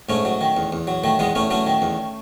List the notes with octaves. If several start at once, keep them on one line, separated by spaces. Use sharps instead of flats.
G#2 A3 C#4
F#3
D#3
E2
E2
F#3
D#3 A3
E2 G#3 B3
E2 A3 C#4
F#3 A3 C#4
D#3
E2